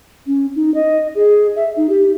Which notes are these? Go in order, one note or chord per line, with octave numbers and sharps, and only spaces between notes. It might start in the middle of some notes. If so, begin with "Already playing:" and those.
C#4
D#4
D#5
G#4
E5
D#4
G4